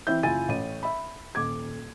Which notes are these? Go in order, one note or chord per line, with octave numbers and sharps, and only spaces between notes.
E3 C4 E4 E5 G6
F#1 E4 F4 G#5 A6 D#7
A1 C#5 D#7
E5 B5
D#1 D6 G#6